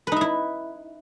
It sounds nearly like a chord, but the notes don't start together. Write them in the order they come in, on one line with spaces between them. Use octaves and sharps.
B4 D#4 E5 E4